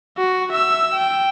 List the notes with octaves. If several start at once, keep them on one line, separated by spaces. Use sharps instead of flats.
F#4
E5 E6
G5